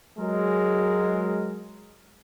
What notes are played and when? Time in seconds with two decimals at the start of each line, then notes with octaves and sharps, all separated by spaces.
0.19 F#3 G#3 A#4